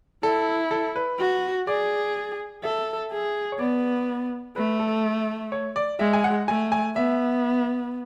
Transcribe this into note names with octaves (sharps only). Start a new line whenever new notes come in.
E4 A4
A4
B4
F#4
G#4 D5
A4 E5
G#4
C#5
B3 D5
A3 B4
A4
C#5
D5
G#3 E5
G#5
F#5
A3 G#5
G#5
B3 E5